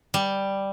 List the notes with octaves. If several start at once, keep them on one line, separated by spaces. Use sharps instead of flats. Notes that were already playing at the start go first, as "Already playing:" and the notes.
G3